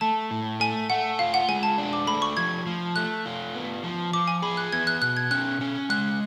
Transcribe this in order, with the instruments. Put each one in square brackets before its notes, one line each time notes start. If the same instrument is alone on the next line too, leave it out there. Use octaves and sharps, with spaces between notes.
[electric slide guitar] A3 [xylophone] A5
[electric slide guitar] A2
[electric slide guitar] A3 [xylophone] G#5
[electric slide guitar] A3 [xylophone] F#5
[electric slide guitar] F4 [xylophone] F5
[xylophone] F#5
[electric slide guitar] G#3 [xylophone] G#5
[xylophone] A5
[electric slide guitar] D4
[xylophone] D6
[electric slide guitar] A3 [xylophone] B5
[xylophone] C#6
[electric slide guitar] F3 [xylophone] G#6
[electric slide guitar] F3
[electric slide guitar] A3 [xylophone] F#6
[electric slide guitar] F4
B3
F3
[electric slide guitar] F3 [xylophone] D6
[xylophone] G#5
[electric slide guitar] G#4 [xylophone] B5
[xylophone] F#6
[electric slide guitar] B3 [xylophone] G#6
[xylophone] F#6
[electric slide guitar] B2 [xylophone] F#6
[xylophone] G#6
[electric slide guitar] C#4 [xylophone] F#6
[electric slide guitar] C#4
[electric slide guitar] G#3 [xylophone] F#6